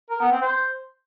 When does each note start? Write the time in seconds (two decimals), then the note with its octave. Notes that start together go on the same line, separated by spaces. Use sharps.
0.10 A#4
0.21 B3
0.31 C4
0.42 C5